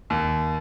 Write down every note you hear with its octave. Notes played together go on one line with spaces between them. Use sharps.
D#2